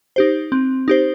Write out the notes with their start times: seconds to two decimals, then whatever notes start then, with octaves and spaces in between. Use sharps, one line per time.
0.16 D#4 G4 C5
0.52 C4
0.88 D#4 G4 C5